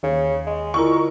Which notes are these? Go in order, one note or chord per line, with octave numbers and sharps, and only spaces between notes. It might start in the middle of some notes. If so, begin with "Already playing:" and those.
D#2 C#3
G#3
D3 E4 F4 A#4 C#6